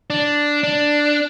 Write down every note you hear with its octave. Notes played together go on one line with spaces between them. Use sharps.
D4
D4